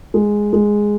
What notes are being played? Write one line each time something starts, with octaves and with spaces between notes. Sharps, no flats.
G#3
G#3